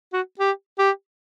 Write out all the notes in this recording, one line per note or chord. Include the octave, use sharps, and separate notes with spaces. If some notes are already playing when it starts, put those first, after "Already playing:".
F#4
G4
G4